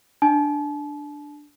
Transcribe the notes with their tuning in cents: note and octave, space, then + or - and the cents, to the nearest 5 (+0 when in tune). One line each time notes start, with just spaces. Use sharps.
D4 +0 A5 -40